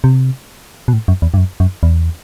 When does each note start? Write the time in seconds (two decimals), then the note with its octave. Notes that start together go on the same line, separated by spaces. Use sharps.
0.04 C3
0.88 B2
0.93 A2
1.08 F#2
1.22 E2
1.34 G2
1.37 F#2
1.60 F#2
1.83 E2